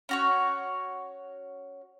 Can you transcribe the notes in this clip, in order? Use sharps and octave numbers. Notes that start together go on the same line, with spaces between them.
C#4 F#4 C#5